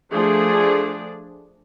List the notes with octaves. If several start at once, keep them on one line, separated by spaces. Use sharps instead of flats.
F3 A3 D4 G#4 D5